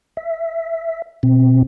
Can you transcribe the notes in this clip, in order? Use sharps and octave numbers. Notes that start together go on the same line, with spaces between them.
E5
B2 C4